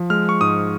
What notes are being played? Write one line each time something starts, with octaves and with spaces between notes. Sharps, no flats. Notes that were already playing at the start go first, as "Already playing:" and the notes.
Already playing: F3
G#3 F6
C#6
G#2 D#6